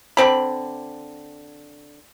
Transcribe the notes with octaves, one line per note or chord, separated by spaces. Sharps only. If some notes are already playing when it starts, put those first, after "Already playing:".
D3 C4 B5